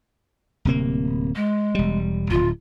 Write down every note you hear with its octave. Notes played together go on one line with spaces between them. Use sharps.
D1 C3 A#3
G#3
E1 G3
D1 G#1 F4